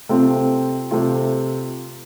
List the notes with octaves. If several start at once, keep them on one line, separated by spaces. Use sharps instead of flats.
C3 A3 C4 F4
C3 A3 C4 F4